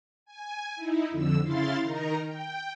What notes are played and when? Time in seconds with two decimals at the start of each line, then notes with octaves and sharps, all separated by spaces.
0.25 G#5
0.76 D#4 E4
1.10 F2 D3 E6
1.43 C#3 E4 F5 C6 A6
1.83 D#3 D#4 A#4 A#5
2.26 G5